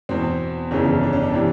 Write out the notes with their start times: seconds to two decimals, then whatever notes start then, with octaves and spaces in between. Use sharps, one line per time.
0.09 E2 B2 C4
0.71 G1 F2 C#3 E3 C#4
1.03 D4
1.13 C#4
1.23 D4
1.34 C3 E3